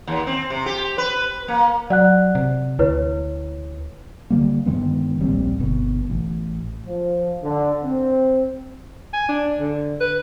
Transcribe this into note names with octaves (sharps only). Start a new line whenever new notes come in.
D#2
C4
C3
G4
B4
A#3
F#3 D5 F#5 F#6
C3
D2 E4 B4 C#5
D3 G3 A#3
G2 D#3 G#3 B3
D1 A#1 G3 C4
G1 B2
A1
F3
D3
C4
G#5
D4
D3
B4